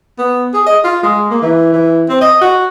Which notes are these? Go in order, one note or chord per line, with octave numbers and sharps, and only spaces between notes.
B3
G#4
D#5
F4
G#3
A#3
E3
E3
C4
D#5
F#4